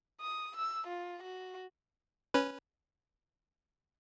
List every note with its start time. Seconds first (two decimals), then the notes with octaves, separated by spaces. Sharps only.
0.21 D#6
0.57 E6
0.87 F4
1.23 F#4
2.34 C#4 B4